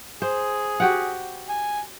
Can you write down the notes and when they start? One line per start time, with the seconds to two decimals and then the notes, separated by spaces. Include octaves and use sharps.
0.22 G#4 C5
0.80 F#4 G4 F#5
1.49 G#5